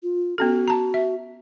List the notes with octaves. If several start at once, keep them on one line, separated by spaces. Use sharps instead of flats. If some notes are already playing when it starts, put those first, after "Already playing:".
F4
B3 C#4 F#4 A4
A5 A#5
E5